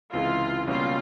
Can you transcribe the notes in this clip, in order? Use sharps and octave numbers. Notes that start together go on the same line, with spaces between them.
C#2 C3 E3 G#3 F4
C#2 B2 G3 A#3 C#4 F4